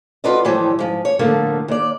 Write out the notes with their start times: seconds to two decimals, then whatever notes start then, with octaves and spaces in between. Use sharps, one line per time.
0.24 F4 F#4 A4 B4 D5 D#5
0.45 A2 E3 F3 G3
0.79 G#2 F3
1.05 C#5
1.19 A2 D3 F3 A3 A#3
1.68 D#2 D5